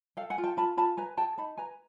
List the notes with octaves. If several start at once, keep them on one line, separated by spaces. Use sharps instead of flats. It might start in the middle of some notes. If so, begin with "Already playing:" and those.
A4 F5 G5
F#5 G#5
F4
G5 A5
F4 A5 B5
F4 A5 B5
B4 G#5 A#5
G#4 G5 A5
D#4 A5 B5
B4 G#5 A#5